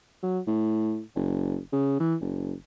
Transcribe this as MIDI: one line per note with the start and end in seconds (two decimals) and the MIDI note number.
0.23 0.39 54
0.47 1.01 45
1.15 1.58 30
1.72 1.97 49
2.00 2.15 52
2.21 2.54 30